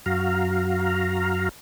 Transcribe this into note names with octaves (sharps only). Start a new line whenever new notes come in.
F#2 F#4 F5 A#5